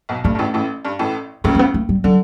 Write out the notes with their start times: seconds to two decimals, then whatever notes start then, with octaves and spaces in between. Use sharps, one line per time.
0.09 B1 B2
0.24 G2 A3
0.35 G2
0.39 A1 A2
0.54 A1 A2
0.85 G2
0.99 A1 A2
1.44 C#2 C#3 A3
1.55 A3
1.59 B3
1.74 A3
1.89 G3
2.04 D3 F#3